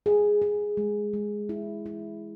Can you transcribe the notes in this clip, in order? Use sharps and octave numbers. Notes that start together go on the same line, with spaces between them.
G#4
G#4
G#3
G#3
E4
E4